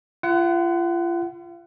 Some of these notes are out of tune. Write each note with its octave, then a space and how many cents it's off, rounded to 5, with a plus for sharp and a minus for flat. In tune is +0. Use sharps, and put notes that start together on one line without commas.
F4 -35 F#5 +20